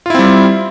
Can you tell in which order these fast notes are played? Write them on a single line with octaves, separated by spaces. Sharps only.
F4 E4 C4 G3